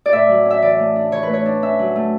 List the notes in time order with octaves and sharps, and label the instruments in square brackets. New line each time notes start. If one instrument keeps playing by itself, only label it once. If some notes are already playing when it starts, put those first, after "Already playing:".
[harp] D5
A2 E5
F#3
C#4
E5
E3 D5
A3
D4
E3 C#5
B4
A3 C#5
D4
C#4 E5
F#3
A3